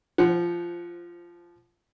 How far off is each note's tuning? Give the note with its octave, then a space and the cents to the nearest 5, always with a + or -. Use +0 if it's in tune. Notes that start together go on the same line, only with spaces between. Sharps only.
F3 -15 C5 +0 F#5 +0